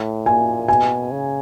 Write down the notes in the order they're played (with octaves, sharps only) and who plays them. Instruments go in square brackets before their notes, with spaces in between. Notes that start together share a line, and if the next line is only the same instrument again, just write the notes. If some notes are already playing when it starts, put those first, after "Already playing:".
Already playing: [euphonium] A2
[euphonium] A#2 [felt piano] G#5
[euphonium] B2 [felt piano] G#5
[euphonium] C#3